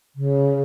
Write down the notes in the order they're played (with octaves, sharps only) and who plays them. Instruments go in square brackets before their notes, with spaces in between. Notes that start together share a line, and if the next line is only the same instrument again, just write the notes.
[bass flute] C#3